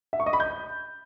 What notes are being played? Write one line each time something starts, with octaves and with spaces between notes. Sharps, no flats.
E5
C#6
D#5
B5
G6